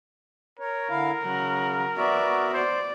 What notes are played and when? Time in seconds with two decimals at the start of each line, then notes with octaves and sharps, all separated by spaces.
0.59 A#4 C#5
0.90 D3 E4 F5
1.23 C#3 F#3 F#5
1.97 B3 F#4 D5 E5
2.53 C5 D5